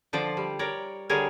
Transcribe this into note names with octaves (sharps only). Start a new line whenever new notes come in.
D3 F3 C5 D5
G3
A#4 C#5 D5
D3 G3 G#4 A#4 C#5